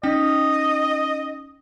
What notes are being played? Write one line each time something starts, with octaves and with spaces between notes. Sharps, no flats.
C#4 D#4 D#5 G5